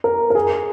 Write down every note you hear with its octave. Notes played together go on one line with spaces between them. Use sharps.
A#4
A#4
G#4